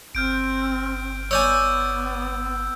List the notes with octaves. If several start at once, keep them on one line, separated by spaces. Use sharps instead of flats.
G1 C4 F6 G6 D7
B3 C#5 D5 G#5 E6 G6